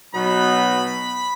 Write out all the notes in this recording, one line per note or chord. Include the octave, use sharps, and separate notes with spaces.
B2 F#3 B3 D#4 B5